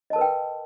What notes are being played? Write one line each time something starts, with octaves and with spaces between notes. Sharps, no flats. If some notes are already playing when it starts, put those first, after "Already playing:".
A#4 B4 D#5 G5 A5